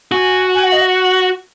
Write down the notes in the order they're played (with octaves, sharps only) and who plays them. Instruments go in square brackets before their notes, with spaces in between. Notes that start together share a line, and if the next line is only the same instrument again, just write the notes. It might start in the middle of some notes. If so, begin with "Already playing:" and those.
[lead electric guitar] F#4 [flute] G#5
[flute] G#5
F#5
D#5
F#5